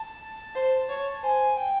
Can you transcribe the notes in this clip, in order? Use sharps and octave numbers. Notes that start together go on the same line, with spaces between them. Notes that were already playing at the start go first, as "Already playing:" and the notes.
Already playing: A5
C5
C#5
C5 G#5
G5